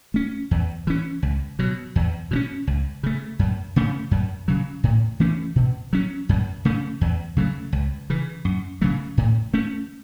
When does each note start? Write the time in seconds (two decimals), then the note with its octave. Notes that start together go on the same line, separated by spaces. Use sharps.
0.14 A3 C#4
0.51 E2
0.87 E3 C#4
1.23 C#2
1.59 B2 F#3
1.96 E2
2.31 B2 F#3 C#4
2.67 C#2
3.03 C#3 A3
3.39 F#2
3.76 C#3 A3 C#4
4.11 F#2
4.48 C#3 F#3
4.84 A2
5.20 E3 A3 C#4
5.56 B2
5.93 F#3 C#4
6.29 F#2
6.65 C#3 A3 C#4
7.01 E2
7.37 C#3 F#3 A3
7.73 C#2
8.10 C#3 E3
8.45 F#2
8.81 C#3 F#3 A3
9.17 A2
9.54 A3 C#4